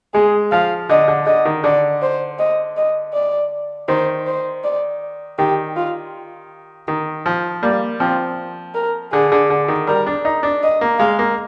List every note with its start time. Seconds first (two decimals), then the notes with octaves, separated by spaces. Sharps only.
0.14 G#3 G#4
0.52 F3 F5
0.89 D3 D#5
1.08 D3
1.26 D3 D#5
1.45 D#3
1.64 D3 D5
2.02 C5
2.39 D#5
2.77 D#5
3.13 D5
3.88 D#3 C5
4.27 C5
4.64 D5
5.39 D#3 G4
5.76 F4
6.88 D#3
7.26 F3
7.63 G3 A#3
8.00 F3 C4
8.75 A#4
9.13 D3 G#4
9.32 D3
9.50 D3
9.68 D#3
9.87 G3 A#4
10.06 D4
10.25 D#4
10.43 D4
10.63 D#5
10.81 A#3
10.99 G#3 F5
11.19 A#3